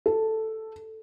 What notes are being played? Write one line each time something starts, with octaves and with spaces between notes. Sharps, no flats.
A4